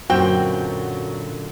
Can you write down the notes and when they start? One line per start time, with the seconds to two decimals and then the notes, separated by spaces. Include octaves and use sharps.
0.10 F#2 A#2 D3 F#3 C4 F#4 G5